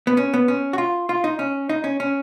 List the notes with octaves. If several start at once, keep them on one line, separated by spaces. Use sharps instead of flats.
B3
C#4
B3
C#4
F#4
F4
F4
D#4
C#4
D#4
C#4
C#4